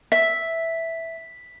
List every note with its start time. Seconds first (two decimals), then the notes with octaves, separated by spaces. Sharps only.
0.12 E5 B6